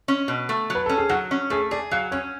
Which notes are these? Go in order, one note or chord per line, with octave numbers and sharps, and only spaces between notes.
C#4
B2
A3
F#3
B4
C#4 A4
G#4
F#3 F#4
C#4
A3 G#4
G#4 D5
F#3 F5
C#4 C#5